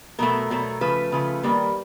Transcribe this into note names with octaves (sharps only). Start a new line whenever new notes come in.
B2 F#3 A3 A#4
B2 F#3 A3
C#3 F3 A3 B4
C#3 F3 A3
D#3 G3 A#3